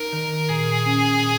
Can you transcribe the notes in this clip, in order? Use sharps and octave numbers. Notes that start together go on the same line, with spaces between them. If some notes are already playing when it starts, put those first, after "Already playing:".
Already playing: D#4 A#4
D#3
A#2 G#4
C#4
A#2